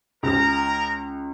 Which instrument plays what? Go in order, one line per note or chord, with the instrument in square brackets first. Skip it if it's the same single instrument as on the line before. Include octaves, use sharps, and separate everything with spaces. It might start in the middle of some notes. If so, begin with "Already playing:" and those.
[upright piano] C#2 G#3 [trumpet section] A#4 A#5